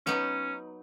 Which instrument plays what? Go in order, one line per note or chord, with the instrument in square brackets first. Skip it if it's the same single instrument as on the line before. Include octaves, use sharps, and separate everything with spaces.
[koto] F#3 B3 D#4 [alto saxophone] C#4